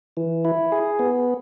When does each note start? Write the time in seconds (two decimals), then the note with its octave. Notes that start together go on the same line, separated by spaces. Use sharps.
0.17 E3
0.45 E4
0.72 G#4
0.99 B3